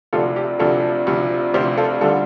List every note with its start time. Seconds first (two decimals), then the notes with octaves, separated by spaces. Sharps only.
0.13 D2 C3 F3 D4 F4 A4
0.36 G4
0.59 D2 C3 F3 D4 F4 A4
1.07 D2 C3 F3 D4
1.54 D2 C3 F3 D4 G4 C5
1.77 F4 A4
2.01 D2 D3 G3 D4 F4 A4